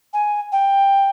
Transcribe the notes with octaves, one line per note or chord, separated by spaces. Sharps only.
G#5
G5